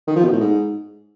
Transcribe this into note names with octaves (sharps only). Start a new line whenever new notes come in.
D#3
F3
B2
A2
G#2